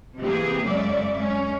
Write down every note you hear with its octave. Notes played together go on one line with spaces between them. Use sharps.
C3 E3 A#3 B3 G4 G#4
F#2 C#3 G#3 C#4 D5 E5
G#3 C#4